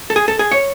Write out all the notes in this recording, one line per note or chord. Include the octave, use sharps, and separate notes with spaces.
A4
G#4
A4
G#4
C#5